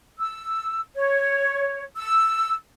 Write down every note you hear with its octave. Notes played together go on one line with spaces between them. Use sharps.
E6
C#5
E6